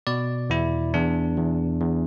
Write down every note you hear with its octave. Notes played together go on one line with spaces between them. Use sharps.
B2 D5
E2 E4
E2 D4
E2
E2